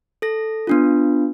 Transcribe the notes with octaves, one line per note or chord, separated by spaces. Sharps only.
A4 A#6
B3 D4 F4